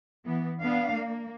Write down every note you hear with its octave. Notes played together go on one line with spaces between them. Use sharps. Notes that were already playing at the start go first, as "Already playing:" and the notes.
E3 B3
B3 D4 F5
A#3